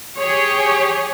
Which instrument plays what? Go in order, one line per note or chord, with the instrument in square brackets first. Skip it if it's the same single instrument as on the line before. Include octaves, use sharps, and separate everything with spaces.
[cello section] G4 G#4 C#5